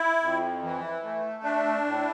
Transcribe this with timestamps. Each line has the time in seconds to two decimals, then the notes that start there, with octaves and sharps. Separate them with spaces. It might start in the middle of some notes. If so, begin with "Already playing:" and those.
Already playing: E4
0.20 F2
0.62 E3
1.03 A3
1.43 D4
1.85 A2